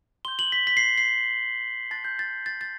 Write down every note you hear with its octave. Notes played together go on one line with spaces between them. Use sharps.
C6 G6 G7
F#7
B6
B6
C7
C7
A5 C6 F#6 A6
G6
A6
A6
A6